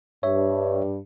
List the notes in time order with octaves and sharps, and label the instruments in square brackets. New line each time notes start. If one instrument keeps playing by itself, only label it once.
[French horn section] G2 [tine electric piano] C#5 E5